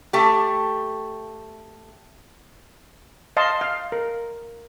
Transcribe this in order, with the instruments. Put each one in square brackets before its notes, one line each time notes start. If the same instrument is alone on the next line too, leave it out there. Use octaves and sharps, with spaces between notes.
[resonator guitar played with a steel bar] A3 G4
[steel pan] D#5 F5 A5 C6
F5
A#4